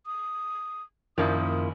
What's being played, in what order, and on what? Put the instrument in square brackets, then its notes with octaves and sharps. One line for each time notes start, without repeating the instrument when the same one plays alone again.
[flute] D#6
[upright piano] A#1 D#3 [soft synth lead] F#2 [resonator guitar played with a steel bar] F3 A#3 E4 [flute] D#6